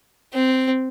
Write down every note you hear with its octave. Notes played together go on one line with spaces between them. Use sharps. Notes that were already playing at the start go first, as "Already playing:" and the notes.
C4